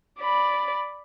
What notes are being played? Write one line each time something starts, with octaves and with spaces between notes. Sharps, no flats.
D5 B5